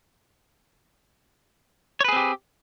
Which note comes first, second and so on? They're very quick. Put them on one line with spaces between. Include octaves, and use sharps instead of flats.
C#5 B4 G#4 C4 G4